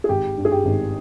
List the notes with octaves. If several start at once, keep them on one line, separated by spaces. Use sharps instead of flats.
G#4
G#1 G4
G2
G#4
G4
G#1